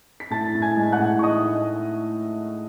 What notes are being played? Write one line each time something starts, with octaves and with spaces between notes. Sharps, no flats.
B6
A2 A5 A6
A2
G#5 G#6
G#3
F#5 F#6
A2
C#6
D#4 D#5 D#6